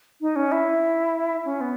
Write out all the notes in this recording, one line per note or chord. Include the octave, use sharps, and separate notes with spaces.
D#4
C#4
E4
C#4
B3